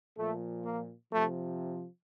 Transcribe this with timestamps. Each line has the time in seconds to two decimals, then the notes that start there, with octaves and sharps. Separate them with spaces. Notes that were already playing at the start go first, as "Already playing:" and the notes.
0.17 A#2 F3 A3
0.64 A#3
1.11 C3 F3 A3